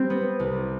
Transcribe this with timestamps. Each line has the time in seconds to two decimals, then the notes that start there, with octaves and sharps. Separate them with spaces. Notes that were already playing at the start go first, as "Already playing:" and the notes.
Already playing: G3 C4
0.10 B3
0.40 C2